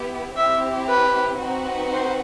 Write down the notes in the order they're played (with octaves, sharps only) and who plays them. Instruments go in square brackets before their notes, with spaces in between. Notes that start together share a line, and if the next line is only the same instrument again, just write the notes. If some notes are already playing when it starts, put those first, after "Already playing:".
Already playing: [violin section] B3 E4 G4
[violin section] C4 E4 G4 [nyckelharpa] E5
[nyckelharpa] B4
[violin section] C4 D#4 F#4 B4 F#5
[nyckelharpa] C5